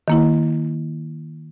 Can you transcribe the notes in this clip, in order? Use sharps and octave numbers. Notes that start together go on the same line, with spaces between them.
D#3 A#3 E4